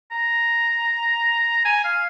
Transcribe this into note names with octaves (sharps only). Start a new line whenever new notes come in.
A#5
G#5
F5